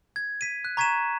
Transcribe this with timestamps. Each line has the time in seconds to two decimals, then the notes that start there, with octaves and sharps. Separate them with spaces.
0.16 G#6
0.41 B6 D#7
0.65 F#6
0.77 A#5 C#6 G#6 B6 D#7 E7